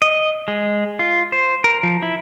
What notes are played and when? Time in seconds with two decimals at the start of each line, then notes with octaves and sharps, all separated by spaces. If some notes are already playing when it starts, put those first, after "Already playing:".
0.02 D#5
0.48 G#3
0.99 F4
1.32 C5
1.64 A#4
1.83 F3
2.02 E4